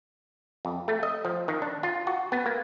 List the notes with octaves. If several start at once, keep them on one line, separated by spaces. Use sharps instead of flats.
F2
A3
D#5
F3
D#3
D4
F4
F#4
B3
A#3